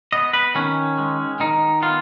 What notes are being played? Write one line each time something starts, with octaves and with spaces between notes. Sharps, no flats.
B3 D#5
B4
D#3 C#4
G#3
D#3 D#4
B3 F4